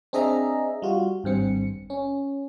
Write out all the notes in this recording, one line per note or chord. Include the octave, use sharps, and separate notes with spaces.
C4 D4 G#4 D#5 E5 A#5
G3 F4 F#4
G#1 G2 C4 C#7
C#4